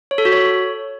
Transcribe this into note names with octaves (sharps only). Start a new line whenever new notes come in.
C#5
A4
F#4
C#5